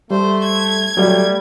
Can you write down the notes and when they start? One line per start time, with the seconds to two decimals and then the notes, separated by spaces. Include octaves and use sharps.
0.11 G3 A3 C5
0.44 G#6
0.97 F#3 G3 A3